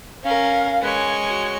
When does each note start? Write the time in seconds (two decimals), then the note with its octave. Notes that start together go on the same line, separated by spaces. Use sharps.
0.24 C#4 A#4 F5
0.82 G#3 B4 C#5
1.28 F#4